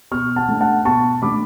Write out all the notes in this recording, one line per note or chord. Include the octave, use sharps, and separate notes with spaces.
B2 C#6 F6
F#5 A5
A3 D4
F#5 A5
B2 A5 C#6
A3 D4 B5 D6